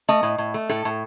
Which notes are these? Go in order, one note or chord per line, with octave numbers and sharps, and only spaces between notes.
A3 D#5
A2
A2
A3
A2 A4
A2